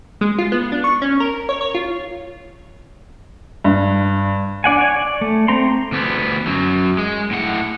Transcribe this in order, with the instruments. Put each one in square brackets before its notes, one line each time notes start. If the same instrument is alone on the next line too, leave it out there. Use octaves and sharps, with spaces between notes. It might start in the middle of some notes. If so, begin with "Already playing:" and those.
[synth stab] G#3
F4
B3
D4
C#6
C#4
A#4
C#5
C#5
F4
[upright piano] G2
[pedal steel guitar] D4 D5 F#5 G#5
C#5 G#5
D5
A3
A3 C4 A#5 C6
[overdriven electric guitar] D2 B3
F#2 F#3
G#3
A2 F#5